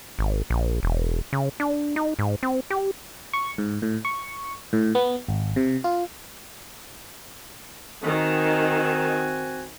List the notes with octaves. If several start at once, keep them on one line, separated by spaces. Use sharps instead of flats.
G#1
A#1
E1
C#3
D4
D#4
G#2
C4
G4
C#6
G#2
A2
C#6
A2
B3
G#1
C3
F4
D#3 C4 F#4 G#5